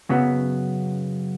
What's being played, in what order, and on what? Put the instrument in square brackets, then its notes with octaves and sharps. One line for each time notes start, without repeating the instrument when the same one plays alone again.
[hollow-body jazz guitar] F#2 C#3 F#3 B3